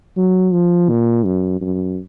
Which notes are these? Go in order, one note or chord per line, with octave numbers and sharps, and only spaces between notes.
F#3
F3
A#2
F#2
F#2